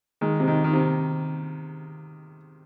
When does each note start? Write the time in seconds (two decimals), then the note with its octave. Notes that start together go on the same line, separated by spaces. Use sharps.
0.21 D#3 G#3
0.40 C3
0.48 D#3
0.64 D#3
0.73 C3